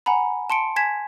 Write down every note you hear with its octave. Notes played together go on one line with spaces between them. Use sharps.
F#5 G#5 A#5 B5
A5 C6 C#7 D7
G#5 G#6 B6 E7